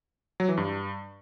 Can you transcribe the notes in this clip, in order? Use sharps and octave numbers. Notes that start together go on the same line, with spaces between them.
F#3
E3
G2